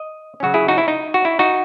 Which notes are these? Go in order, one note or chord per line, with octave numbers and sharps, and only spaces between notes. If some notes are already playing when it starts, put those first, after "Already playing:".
Already playing: D#5
C#3 F#3 C#4 F#4
E4 G#4
D#4 F#4
E4
D#4
F#4
E4
D#4 F#4